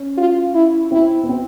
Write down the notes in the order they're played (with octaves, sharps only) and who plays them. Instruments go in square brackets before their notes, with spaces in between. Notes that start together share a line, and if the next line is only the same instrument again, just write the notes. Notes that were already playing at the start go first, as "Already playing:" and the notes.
Already playing: [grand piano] C#4
[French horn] F4
E4
[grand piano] C4 [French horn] E4
[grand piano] B3
C4